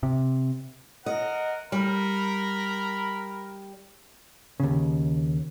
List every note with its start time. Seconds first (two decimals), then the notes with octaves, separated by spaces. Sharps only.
0.03 C3
1.06 A#4 D#5 F#5
1.72 G3 A#4 B5
4.60 D#2 C#3